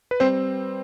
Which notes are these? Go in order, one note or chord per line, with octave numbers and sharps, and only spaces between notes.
B4
G3 C4 C5